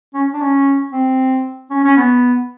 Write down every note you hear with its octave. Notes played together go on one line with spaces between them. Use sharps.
C#4
D4
C#4
C4
C#4
C#4
B3